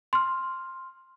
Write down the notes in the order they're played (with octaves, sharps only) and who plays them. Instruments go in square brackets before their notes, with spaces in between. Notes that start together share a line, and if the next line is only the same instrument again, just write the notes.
[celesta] C6 F6